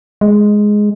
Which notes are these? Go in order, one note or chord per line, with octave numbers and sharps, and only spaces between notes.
G#3